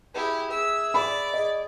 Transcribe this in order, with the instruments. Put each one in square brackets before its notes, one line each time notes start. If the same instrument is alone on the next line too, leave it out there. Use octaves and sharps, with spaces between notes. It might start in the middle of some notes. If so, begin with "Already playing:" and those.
[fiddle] E4 G4 [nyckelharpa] G#4
[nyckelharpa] G#4 E5 [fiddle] E6
[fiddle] D5 [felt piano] B5
[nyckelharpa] G#4 [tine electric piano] D#5